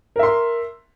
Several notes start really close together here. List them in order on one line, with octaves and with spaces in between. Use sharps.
A#4 E5 C6